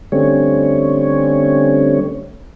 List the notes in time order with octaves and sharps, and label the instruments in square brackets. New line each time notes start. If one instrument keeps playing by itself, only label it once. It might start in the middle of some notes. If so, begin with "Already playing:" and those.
[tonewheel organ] D3 G3 A3 C4 C#4 C#5